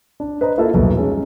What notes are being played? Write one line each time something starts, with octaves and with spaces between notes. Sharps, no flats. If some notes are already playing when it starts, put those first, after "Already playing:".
D4
B4 C5 D#5 A#5
A#3 E4 F4 A4
B1 E2 G2 A#2
G#3 C#4 D#4